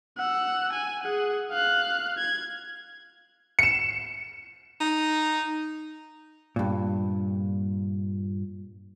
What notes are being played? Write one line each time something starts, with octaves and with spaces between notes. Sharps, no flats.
F#5 E6
G#5
G#4 F#5
F5 F#6
G#6
C#7 E7
D#4
G2 A#2